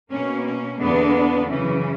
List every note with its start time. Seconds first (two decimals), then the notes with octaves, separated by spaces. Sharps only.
0.11 B2 A#3 C#4
0.46 C#4
0.80 E2 D3 A#3 B3 D4
1.49 F#2 C#3 E3 C#4